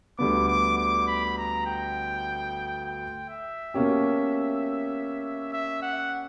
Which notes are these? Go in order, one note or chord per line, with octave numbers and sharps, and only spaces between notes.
D2 D3 G3 B3 D6
D6
D6
B5
A#5
G5
G5
E5
B2 A#3 C#4 G4
E5
F#5